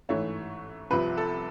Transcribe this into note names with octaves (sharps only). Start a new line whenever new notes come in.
G#2 E3 A3 C#5
C2 C3 F3 B4
A4